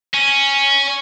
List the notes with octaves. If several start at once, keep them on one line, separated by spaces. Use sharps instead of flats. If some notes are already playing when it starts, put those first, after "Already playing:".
C#4